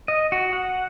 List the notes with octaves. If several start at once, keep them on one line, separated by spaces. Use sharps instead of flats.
D#5
F#4
F#5